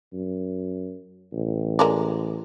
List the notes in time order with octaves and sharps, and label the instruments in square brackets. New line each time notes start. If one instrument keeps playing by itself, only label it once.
[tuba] F#2
A1
[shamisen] G#3 A#4 D5